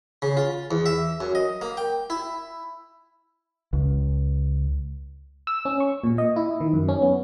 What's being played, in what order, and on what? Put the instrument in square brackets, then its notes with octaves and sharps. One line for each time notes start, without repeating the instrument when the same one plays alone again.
[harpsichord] C#3
F4
E2
E5
F#2
D#5
A#3
G5
E4
[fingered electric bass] C#2
[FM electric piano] E6
C#4
C#6
A#2
D#5
E4
D#3
F#2
C#4
B3